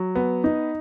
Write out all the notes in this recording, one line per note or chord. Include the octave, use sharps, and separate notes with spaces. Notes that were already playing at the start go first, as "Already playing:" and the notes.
Already playing: F#3
B3
D#4